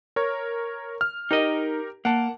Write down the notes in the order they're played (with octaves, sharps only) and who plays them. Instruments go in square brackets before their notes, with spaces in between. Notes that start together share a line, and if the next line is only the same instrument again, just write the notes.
[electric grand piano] A#4 C#5
F6
[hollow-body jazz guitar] D#4 D#5 [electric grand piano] G4 A#4
[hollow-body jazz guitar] A#3 [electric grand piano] F#5 A5